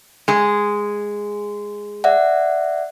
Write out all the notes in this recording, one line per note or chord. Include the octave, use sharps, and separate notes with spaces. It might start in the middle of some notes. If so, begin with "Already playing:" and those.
G#3 G#4
D5 E5 F#5